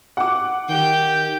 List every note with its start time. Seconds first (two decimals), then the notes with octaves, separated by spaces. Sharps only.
0.17 F#5 D6
0.68 D#3 G4 G5